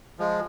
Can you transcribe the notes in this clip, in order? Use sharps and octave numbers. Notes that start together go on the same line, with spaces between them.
F3 G#3